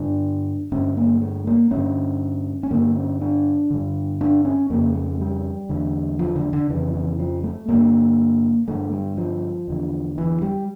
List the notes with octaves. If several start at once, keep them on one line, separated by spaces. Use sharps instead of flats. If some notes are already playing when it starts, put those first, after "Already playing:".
Already playing: G2 D3 D4
G2 D3 C#4
A#3
A3
A#3
G2 D3 C#4
C#4
G2 D3 A#3
C#4
D4
G2 D3
D4
C#4
F2 C#3 A#3
A3
G3
E2 D3
F3
D3
D3
F2 C#3 E3
E3
F3
A3
G2 D3 A#3
G2 D3 A3
G3
F3
E2 D3
E3
G3